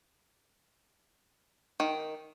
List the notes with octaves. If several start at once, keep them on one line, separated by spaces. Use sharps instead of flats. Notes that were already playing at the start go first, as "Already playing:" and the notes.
D#3